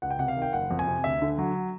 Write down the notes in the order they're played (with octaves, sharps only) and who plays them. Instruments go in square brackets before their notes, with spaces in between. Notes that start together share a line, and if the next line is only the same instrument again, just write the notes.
[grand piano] C#2 F#5
G5
C3 F#5
F5
D#3
G5
F#1 F#5
F2
G#5
C3
D2 E5
D3
F#3